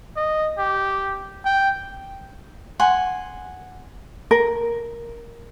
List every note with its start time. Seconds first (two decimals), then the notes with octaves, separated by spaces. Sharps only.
0.16 D#5
0.58 G4
1.45 G5
2.80 F#5 G#5 C6
4.31 A#4